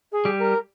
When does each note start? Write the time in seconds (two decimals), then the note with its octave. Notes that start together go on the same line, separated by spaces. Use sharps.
0.12 G#4
0.25 G3 G4
0.39 A#4